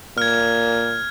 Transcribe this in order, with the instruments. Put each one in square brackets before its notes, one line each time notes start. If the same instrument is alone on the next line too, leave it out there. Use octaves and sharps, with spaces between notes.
[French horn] A#2 [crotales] F6 G#6